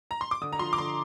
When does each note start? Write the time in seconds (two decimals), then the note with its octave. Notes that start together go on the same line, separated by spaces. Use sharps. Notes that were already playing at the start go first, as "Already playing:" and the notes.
0.11 A#5
0.21 C6
0.31 D6
0.41 D3 D#6
0.53 A#5
0.59 F3 C6
0.73 D6
0.78 D3 C6